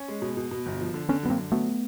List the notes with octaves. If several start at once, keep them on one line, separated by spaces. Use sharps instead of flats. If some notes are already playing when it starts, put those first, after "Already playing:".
Already playing: C#4
G#3
B2
B2
B2
G1
F3
D3
D3 B3 C#4
F#2 B3
A#3 C4
D3
F#3 A3 B3